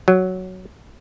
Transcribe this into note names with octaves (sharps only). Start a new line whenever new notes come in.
F#3